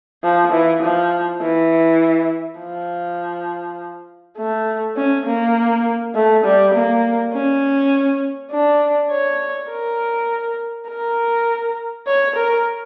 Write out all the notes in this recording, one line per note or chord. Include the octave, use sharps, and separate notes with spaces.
F3
E3
F3
E3
F3
A3
C#4
A#3
A3
G3
A#3
C#4
D4
C#5
A#4
A#4
C#5
A#4